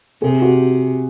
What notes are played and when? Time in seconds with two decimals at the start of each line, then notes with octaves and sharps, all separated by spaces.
0.22 C3 G#4
0.42 F#4